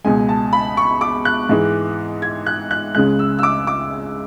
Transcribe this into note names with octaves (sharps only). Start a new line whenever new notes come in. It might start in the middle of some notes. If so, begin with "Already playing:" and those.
C#2 B2 G#3 G#5
A5
B5
C#6
D6
F#6
G#2 E3 G#3
G#6
F#6
F#6
C#2 C#3 G#3 F#6
E6
E6
D6
D6